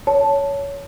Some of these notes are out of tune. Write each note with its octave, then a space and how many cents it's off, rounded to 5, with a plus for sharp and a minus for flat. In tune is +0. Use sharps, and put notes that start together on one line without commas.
C#5 +15 A5 +0